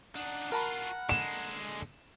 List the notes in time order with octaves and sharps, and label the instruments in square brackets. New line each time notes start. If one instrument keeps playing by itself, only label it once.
[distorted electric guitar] D4 D#4 [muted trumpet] F#5
[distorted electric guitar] F4 F#4 [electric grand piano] A#4 A5 B5
[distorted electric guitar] D3 G#3 [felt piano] E7